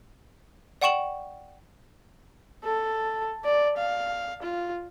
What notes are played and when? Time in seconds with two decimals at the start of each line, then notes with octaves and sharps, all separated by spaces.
0.81 D5 F#5 G5 C#6 E7 F#7
2.64 A4
3.44 D5
3.77 F5
4.42 F4